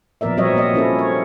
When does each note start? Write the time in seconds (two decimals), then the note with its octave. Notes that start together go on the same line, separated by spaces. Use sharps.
0.21 A#2 F3 B3 A#4 D5 E5
0.37 F#3 G3 C4 C#5 D#5 E5
0.54 A#2 A#3 D#5
0.74 A#3 C#4 E4 A4
0.99 C#5